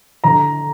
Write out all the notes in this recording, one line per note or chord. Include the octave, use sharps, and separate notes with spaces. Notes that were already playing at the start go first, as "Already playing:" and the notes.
D3 A#5